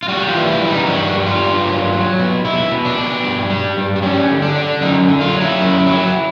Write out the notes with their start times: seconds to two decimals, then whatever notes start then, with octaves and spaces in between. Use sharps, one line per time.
0.03 F4
0.08 G3 F#4
0.28 F4
0.34 E3
0.48 E4
0.62 G3
0.67 D#4
0.87 G2 F#4
1.14 G3
1.26 F4
1.40 G2
1.66 F#3
1.92 F#3
2.19 B2
2.45 B2 E4
2.72 B2
2.85 D4
2.98 B2
3.24 G2
3.50 G3
3.77 G2
3.96 D4
4.02 G3 C#4
4.30 D3
4.42 D4
4.56 D3
4.81 F#2 D#4
5.08 D3
5.21 F4
5.34 F#3
5.41 E4
5.60 F#2
5.87 F#3